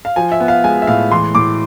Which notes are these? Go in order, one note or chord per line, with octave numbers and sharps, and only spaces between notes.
F5
F3 G#5
E5
B3
F5
G#3 G#5
E5
A2 F5
E3 C6
A2 D6